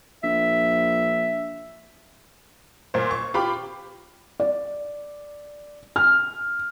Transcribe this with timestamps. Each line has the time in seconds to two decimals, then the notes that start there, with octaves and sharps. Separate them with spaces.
0.23 A#1 E5
2.94 A#2 C5
3.11 C#6
3.34 F4 G4 B5 D6
4.40 D5
5.96 F6